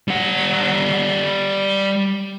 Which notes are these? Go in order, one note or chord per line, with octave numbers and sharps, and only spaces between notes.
G3 F#5